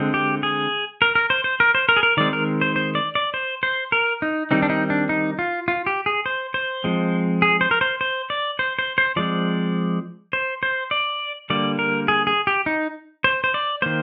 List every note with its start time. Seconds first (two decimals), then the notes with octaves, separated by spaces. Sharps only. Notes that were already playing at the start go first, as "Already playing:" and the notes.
Already playing: D3 G#3 C4
0.14 G4
0.43 G#4
1.02 A#4
1.15 A#4
1.30 C5
1.44 C5
1.60 A#4
1.75 C5
1.89 A#4
1.97 G#4
2.03 A#4
2.17 D#3 G#3 C4 D5
2.33 A#4
2.61 C5
2.76 C5
2.95 D5
3.15 D5
3.34 C5
3.63 C5
3.92 A#4
4.22 D#4
4.51 D#3 G3 C4 D#4
4.62 D4
4.70 D#4
4.90 D4
5.09 D#4
5.39 F4
5.68 F4
5.86 G4
6.06 G#4
6.26 C5
6.54 C5
6.84 F3 G#3 C4
7.42 G#4
7.61 C5
7.71 A#4
7.81 C5
8.01 C5
8.30 D5
8.59 C5
8.79 C5
8.98 C5
9.16 F3 G#3 C4 D5
10.33 C5
10.63 C5
10.91 D5
11.50 D3 G3 A#3 D5
11.79 A#4
12.08 G#4
12.27 G#4
12.47 G4
12.66 D#4
13.24 C5
13.44 C5
13.54 D5
13.82 D#3 A#3 C5